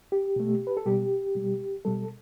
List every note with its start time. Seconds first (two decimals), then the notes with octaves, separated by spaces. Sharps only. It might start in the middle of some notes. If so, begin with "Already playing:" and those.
0.12 G4
0.36 B2 A3
0.67 B4
0.77 A4
0.86 B2 G3 G4
1.35 B2 G3
1.85 B2 G3 A4